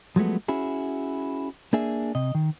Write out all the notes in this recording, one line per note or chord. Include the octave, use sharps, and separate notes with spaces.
F3 F#3 G#3 A3 B3
C#4 E4 F#4 G#4
A#3 D4 G#4 E5
C3 D#5
D#3